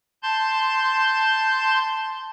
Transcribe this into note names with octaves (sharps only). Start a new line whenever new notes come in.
A5 C6 G6